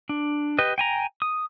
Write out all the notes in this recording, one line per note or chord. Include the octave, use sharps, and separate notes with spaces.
D4
G4 B4 D#5
G5 G#5 A#5
D#6